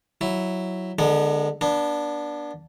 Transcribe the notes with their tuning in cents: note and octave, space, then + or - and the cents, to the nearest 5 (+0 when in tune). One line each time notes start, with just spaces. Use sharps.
F#3 +0 E4 +0
D3 +20 G#3 +0 B3 -35
B3 -35 D4 +0